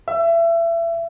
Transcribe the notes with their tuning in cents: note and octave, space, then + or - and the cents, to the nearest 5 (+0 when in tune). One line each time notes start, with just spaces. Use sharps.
E5 +30